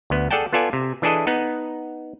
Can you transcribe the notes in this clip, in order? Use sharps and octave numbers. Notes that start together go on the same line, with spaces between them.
D2 B3
G#4 A4 D5 F#5 G5 A5
B3 F4 A4 D5 G#5
C3
E3 D4 E4 G#4 A4 D#5
B3 D#4 F#5